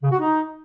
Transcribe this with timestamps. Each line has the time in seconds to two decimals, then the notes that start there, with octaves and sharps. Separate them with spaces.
0.03 C#3
0.11 F#4
0.20 D#4